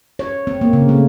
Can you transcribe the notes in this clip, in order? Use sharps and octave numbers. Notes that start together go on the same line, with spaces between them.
C#5
C4
A#3
C#3
A3